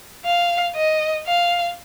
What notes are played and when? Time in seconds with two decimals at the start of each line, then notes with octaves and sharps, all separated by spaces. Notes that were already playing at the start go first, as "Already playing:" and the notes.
0.25 F5
0.76 D#5
1.27 F5